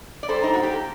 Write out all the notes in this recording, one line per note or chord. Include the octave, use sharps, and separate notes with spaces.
D5
G3 A4 C5
D#4
A#3 F#4
G4
A4